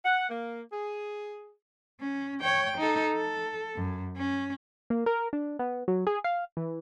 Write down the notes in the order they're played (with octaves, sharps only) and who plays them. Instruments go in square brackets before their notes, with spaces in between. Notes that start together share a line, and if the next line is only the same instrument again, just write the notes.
[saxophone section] F#5
A#3
G#4
[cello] C#4
C#5 G5
D#4 A4
A4
F#2
C#4
[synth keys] A#3
A#4
D4
B3
F#3
G#4
F5
E3